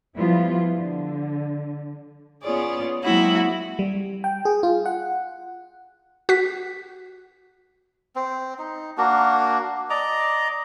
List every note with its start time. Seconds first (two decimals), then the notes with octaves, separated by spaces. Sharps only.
0.16 F3 G3 B3 E4 F4
0.74 D3
2.42 B3 C#4 F4 G#4 C#5 D5
3.04 F#3 G#3 A#3 C4 E4 F#4
3.79 G3
4.24 G5
4.45 G#4
4.63 F4
4.86 F#5
6.29 F#4 B6
8.16 C4
8.59 D#4
8.98 A#3 D4 F#4
9.90 D5 D#5 A#5